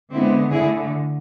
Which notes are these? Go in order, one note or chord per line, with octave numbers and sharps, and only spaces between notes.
D3 G#3 B3 C4 E4
D3 A3 E4 G#4